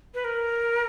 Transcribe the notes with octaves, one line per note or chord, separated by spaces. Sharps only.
B4
A#4